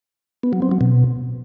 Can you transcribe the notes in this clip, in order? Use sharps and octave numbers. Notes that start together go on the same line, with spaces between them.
B3
F#3
C4
F#3
B2